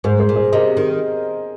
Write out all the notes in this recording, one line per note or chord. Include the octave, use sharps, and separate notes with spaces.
G#2 G#4 C5
G#4 C5
A#2
G#4 C5
C3 A#4 D#5
D#3